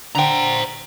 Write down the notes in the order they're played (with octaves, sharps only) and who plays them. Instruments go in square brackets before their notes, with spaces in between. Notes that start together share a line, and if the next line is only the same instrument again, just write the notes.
[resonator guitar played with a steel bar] D3 G5 [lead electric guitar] C5 A#5